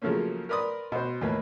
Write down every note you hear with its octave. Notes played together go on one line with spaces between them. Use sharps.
C#3 F3 F#3 A3 A#3 C#4
A#4 B4 D5 C6 D#6
B2 C5
D#2 A2 A#3 B4